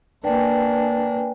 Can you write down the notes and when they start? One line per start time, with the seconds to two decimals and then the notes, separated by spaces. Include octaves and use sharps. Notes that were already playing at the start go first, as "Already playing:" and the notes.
0.24 A#3 D4 B4 G5 G#5